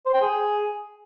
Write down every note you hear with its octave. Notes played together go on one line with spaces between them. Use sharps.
C5
G5
G#4